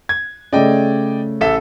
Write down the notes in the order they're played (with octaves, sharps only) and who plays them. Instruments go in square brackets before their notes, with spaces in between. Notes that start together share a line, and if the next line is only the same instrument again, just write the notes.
[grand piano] G#6
[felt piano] C#3 A3 [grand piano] D5 D#5 G5
[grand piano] A1 A4 E5